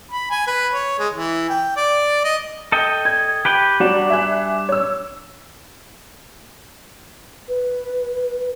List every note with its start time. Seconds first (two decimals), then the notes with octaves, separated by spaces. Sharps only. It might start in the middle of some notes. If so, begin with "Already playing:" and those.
0.11 B5
0.31 G#5
0.47 B4
0.73 C#5
0.99 G#3
1.13 E3
1.50 G5
1.76 D5
2.24 D#5
2.72 A4 D#5 G5
3.05 G#6
3.45 G4 B4 G5
3.80 F#3 G3 D4 F#4 D5
4.10 E5 G#5 F#6
4.69 C#5 E6
7.49 B4